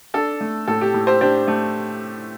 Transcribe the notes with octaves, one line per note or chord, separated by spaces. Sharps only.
D4 A4
A3
A2 A4
G4
A2
G4 C5
D4 G4 C5
A3